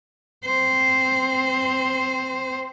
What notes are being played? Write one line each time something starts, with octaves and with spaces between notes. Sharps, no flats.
C4 C5